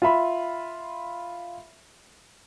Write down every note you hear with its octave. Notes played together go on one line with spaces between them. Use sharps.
F4 E5 B5